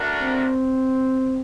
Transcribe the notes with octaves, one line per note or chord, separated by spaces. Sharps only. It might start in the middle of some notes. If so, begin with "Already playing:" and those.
Already playing: A3 D4 F#4 A#4
C4